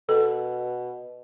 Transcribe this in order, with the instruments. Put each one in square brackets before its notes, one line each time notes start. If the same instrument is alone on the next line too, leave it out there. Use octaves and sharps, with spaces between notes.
[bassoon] B2 [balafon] A4